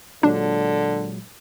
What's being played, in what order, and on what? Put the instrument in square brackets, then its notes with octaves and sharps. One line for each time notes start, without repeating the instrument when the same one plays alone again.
[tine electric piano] A#2 F#3 G#3 [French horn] D3 [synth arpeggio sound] D4